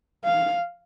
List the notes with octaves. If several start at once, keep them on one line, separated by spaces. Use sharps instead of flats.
F5